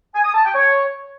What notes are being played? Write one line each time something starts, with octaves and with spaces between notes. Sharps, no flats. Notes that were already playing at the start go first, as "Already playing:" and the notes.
G#5
D#6
A5
G5
C#5